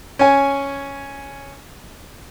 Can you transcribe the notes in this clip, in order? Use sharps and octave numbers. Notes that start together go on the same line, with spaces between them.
C#4 G#5